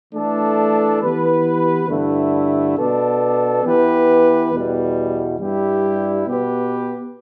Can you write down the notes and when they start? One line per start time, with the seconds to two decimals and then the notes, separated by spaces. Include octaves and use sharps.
0.14 E3 A3 D4 A4
1.02 E3 B3 G4 B4
1.89 G2 D3 A3 E4
2.77 B2 B3 D4 A4
3.64 E3 B3 G4 B4
4.52 E2 B2 G3
5.38 G2 G3 E4 G4
6.26 B2 B3 G4 B4